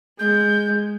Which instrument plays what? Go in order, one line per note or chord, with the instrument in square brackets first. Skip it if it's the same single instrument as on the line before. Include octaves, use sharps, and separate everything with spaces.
[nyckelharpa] G#3 [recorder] G6